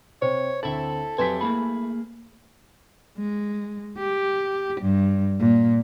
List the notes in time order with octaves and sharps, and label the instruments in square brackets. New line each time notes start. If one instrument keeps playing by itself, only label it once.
[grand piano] C3 [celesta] C5 [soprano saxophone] C#5
[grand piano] D2 C4 A6 [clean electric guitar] E4 E5 [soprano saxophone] A4
[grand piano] F2 F#3 B6 [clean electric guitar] G4 E5 G#5 [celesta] B4 C6
[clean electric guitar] A3 A#3 G#4 [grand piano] E4 [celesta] B5
[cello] G#3
G4
G2
A#2